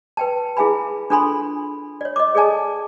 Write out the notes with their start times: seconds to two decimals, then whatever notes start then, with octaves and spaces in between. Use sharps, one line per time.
0.17 B4 G5 A5
0.57 E4 G#4 F5 G#5 B5
1.10 D4 F4 A4 G#5 B5 C6
2.01 C#5 D5
2.16 D#5 D6
2.35 G#4 A4 D5 G#5 A5